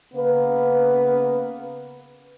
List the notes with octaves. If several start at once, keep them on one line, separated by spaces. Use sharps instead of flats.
C#3 A#3 B3 B4